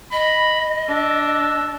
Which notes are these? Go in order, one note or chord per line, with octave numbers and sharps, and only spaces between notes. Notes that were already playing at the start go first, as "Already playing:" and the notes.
D#5 B5
D4 E6